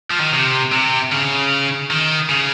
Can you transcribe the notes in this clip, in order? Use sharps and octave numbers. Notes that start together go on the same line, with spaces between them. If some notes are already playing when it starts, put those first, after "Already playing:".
F3
D#3
C3
C3
C#3
D#3
C#3